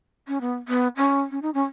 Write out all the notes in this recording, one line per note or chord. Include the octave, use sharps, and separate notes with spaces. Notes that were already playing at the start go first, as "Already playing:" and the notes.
C#4
B3
B3
C#4
C#4
D#4
C#4